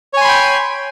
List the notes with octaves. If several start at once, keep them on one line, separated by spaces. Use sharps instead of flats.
C#5 G5 G#5 B5 C6